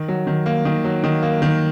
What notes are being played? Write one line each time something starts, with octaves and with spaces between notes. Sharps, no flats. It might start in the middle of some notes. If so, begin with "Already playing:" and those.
Already playing: D#3
F#3
D#3
A#3
D#3
F#3
D#3
A#3
D#3